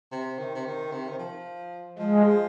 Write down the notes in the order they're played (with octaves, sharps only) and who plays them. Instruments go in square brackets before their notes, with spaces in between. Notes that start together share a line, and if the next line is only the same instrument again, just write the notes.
[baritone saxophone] C3
D#3
C3
D#3
C3
D#3
F3
[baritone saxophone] F3 [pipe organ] G#3